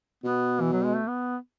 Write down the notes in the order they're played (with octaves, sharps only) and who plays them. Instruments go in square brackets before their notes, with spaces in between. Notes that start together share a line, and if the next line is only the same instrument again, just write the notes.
[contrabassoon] B2 [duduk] B3
[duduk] E3
F#3
G#3
A3
B3